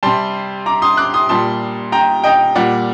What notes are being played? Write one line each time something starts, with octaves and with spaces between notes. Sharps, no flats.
C3 G3 A5 C6
A#5 D6
C6 D#6
D6 F#6
C6 D#6
A#2 G3 A5 C6
G5 A#5
D#5 G5
A#2 G3 D5 F#5